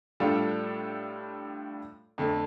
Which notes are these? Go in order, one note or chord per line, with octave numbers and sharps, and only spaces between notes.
A2 G3 D4 F4 A4
F2 D3 A3